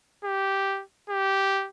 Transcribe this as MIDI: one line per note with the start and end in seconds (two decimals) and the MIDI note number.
0.24 0.83 67
1.10 1.68 67